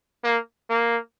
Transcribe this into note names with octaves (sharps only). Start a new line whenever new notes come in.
A#3
A#3